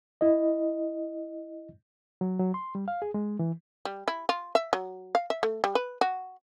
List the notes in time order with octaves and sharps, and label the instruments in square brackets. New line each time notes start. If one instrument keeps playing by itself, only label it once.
[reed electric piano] E4 D#5
F#3
F#3
C6
G3
F5
G#4
G#3
E3
[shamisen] G3
E4
F4
E5
F#3
F5
E5
A3
G3
B4
F#4